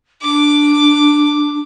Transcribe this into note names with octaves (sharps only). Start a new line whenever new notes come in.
D4 D6